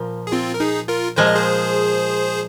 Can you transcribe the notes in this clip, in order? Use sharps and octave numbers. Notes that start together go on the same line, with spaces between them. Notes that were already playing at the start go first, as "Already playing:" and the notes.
Already playing: A#2 F3
G#4
C4 F4
A#4
D#4 G#4
F4 A#4
A#2 F3 G#3 C5
D#5
G#4 C5